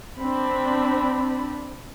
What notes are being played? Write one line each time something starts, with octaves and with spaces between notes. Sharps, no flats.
C4 D4 B5